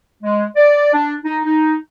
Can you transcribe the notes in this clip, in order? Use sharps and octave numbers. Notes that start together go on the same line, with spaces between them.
G#3
D5
D4
D#4
D#4